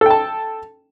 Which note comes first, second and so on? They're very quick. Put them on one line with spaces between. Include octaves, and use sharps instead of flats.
A4 G5 A5